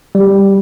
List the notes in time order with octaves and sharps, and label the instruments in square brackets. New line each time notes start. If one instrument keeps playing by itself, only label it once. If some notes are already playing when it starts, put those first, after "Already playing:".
[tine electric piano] G3